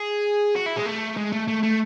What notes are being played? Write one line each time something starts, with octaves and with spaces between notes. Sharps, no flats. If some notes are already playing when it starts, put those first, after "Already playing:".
Already playing: G#4
F#4
E4
G#3
A3
G#3
A3
A3
A3